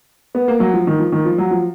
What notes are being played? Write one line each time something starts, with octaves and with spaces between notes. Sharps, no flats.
B3
A#3
F#3
F3
D#3
F3
D#3
F3
F#3
F3